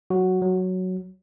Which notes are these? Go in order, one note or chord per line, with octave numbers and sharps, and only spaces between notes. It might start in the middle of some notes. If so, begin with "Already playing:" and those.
F#3 F#4
F#3